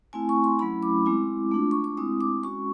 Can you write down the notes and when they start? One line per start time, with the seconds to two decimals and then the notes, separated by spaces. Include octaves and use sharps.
0.13 A3 C4 E4 G#5
0.29 C#6
0.44 C6
0.59 F#3 A3 C#4 E4 B5
0.83 D6
1.06 G#3 C4 E4
1.51 A3 D4 F4
1.71 C#6
1.84 D6
1.97 G#3 C4 E4 D#6
2.21 D6
2.43 G#3 C#4 F#4 C#6